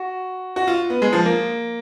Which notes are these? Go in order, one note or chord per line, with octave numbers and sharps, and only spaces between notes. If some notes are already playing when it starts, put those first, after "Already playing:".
Already playing: F#4
F#4
F4
B3
G#3
F3
A#3